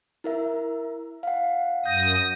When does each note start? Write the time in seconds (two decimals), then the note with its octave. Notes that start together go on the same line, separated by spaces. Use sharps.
0.24 E4 A#4 E5
1.23 F5 F#5
1.86 F#2 D#6 G6 A#6